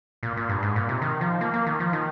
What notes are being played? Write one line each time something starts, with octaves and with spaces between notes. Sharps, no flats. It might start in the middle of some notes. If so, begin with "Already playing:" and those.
A#2
A#2
G2
G#2
A#2
C3
D#3
F3
A#3
A#3
D#3
F3
D#3